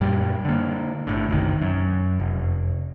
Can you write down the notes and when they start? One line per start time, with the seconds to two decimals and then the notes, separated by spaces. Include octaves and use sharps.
0.01 F#2 A#2 G3
0.45 D3 A#3
1.07 G1 A2 D3
1.30 F#1 B1 D#3
1.62 F#2
2.20 F1